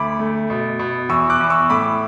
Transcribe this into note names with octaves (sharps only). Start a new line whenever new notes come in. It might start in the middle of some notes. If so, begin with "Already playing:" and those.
Already playing: D2 B5 D6
A3
B2
B2
E2 C#6 E6
D6 F#6
E2
C#6 E6
A2 B5 D6